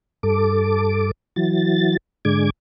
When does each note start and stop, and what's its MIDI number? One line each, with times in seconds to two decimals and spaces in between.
0.23 1.11 43
0.23 1.11 69
0.23 1.11 86
1.36 1.97 52
1.36 1.97 54
1.36 1.97 93
2.25 2.50 44
2.25 2.50 50
2.25 2.50 56
2.25 2.50 86
2.25 2.50 92